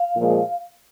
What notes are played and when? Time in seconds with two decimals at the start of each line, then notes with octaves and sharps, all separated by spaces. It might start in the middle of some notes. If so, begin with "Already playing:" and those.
Already playing: F5
0.15 A#2 F3 G#3